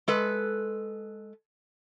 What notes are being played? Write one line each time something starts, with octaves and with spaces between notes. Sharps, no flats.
G#3 A4 B4